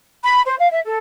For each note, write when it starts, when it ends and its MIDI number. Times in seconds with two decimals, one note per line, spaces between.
0.24 0.41 83
0.46 0.55 72
0.59 0.68 77
0.71 0.80 76
0.85 0.98 69